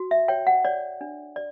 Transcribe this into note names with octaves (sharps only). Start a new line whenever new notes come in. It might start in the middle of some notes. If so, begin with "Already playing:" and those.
Already playing: F#4
E5
C#5 G5
F#5
C#5 D5
D4
D5